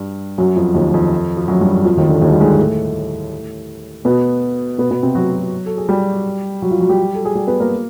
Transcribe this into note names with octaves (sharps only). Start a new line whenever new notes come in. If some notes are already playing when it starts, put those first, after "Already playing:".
Already playing: G2 G3
F#2 F#3
F2 F3
D#2 D#3
F2 F3
F3
F#2 F#3
G2 G3
F2 F3
D#2 D#3
D3
D#2 D#3
G3
G#2 G#3
A2 A3
B2 B3
B2 B3
B2 B3
C3 C4
F#3 F#4
A4
G#4
G3 G4
F#3 F#4
F3 F4
F#3 F#4
G3 G4
A4
G#4
G3 G4
B3 B4
A#3 A#4